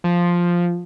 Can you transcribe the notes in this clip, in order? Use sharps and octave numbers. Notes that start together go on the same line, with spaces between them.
F3